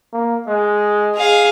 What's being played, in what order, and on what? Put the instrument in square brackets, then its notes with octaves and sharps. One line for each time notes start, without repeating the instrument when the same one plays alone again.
[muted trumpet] A#3
[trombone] G#3 [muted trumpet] D#5
[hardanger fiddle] G#4 F5